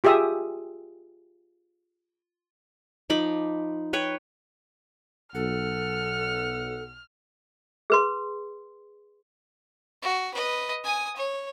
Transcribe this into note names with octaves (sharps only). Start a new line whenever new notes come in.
F4 G4 G#4 E5 D#6
F3 D#4 B5 D6
B4 C#5 G5
B1 A4 F#5 F6
G#4 B4 C6
F#4
B4 D#5
G#5 D#6
C#5